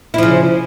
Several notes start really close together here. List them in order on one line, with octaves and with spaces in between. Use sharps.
E4 F3 C#3